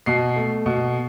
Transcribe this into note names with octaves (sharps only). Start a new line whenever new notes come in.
B2 C7
A3
B2